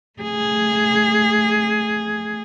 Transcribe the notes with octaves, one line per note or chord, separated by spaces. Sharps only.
A3 G#4